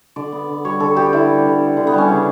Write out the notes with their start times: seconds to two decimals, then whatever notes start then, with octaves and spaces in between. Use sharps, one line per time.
0.16 D3 D5
0.32 B3
0.49 D3
0.65 G3 C#5
0.80 D3 A4
0.96 B3 G4
1.13 D3 E4
1.29 G3
1.45 D3
1.61 B3
1.77 D3
1.87 B3
1.94 G3 C#4
2.09 C#3 D4